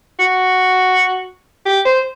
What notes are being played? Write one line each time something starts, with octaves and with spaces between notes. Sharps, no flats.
F#4
G4
C5